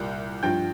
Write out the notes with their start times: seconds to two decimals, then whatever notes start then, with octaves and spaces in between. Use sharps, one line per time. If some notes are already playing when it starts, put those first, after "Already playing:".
Already playing: C2 A#2 G3
0.43 G2 F3 G5 G6